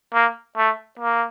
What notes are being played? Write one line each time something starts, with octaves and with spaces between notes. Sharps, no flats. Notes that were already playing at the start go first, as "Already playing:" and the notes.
A#3
A3
A#3